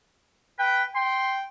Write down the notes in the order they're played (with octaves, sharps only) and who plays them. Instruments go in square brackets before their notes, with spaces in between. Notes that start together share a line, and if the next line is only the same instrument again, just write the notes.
[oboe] B4 [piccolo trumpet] G5
[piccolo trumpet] G5 [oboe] C6